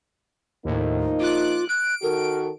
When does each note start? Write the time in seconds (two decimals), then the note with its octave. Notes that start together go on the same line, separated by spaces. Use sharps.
0.65 D#2 A2 F3 A#3 D#4
1.20 F4 D6 F#6
1.69 F#6 D7
2.02 D#3 F#4 A4 A#4